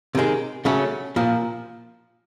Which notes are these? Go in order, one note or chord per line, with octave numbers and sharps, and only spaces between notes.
C3 D#3 G#3
C#3 F#3 A3 C#4
A#2 F3